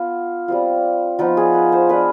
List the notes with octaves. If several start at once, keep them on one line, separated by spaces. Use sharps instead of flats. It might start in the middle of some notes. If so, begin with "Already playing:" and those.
Already playing: B3 F4
G3 C4 F4
F3 B3 D#4 F4
G#4
B4
C5
B3 D4 F4 B4